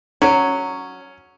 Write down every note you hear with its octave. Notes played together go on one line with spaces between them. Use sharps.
F#3 C#4